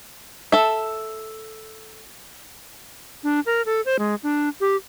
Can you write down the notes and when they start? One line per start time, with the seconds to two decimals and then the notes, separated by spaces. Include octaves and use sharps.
0.52 A4 E5
3.24 D4
3.46 A#4
3.66 A4
3.86 C5
3.99 G#3
4.23 D4
4.61 G4